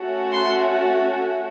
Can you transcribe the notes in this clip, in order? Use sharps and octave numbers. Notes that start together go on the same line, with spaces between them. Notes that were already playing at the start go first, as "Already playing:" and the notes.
Already playing: A3 C#4 F#4
C6